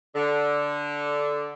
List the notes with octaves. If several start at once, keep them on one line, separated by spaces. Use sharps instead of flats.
D3